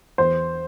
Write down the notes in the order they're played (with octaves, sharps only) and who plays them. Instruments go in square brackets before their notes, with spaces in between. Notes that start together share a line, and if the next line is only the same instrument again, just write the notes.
[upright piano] E2 C5